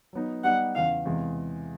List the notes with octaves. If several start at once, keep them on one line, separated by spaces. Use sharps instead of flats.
F#3 B3 D#4
G3 B3 D#4 G4 F#5
E2 C#3 E3 F5
E2 C3 E3 G#3